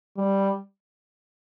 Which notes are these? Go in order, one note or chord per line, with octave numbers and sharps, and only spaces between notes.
G3